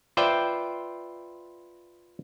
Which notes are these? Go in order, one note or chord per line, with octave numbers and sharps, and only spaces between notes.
F4 B4 C5 D5 E5 G5